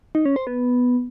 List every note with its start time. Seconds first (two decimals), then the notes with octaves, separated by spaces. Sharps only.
0.15 D#4
0.25 C#4
0.36 C5
0.47 B3